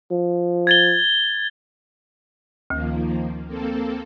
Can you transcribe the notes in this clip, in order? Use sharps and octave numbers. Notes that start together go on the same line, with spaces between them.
F3
G#6 A6 G7
D2 D#3 F3 A#3
A#3 C4 A4